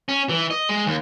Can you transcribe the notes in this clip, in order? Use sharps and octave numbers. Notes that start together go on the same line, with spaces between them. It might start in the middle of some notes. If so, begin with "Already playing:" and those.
C#4
E3
D#5
G#3
D#2